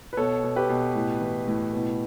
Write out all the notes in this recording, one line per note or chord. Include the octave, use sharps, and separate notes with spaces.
B4
B2 A4 C#5
B2
G4 B4
B2
A2
E3
A2
B2